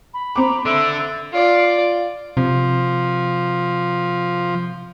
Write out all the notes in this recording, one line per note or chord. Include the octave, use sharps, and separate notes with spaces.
B5
C4 A#5 D6
D3 E5 E6
F4 D5
C3 F3